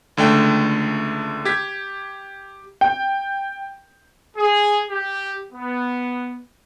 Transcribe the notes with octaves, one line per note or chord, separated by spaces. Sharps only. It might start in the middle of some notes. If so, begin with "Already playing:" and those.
C#2 D3 A3 G5
G4 G#6 B6
G5
G#4
G4
B3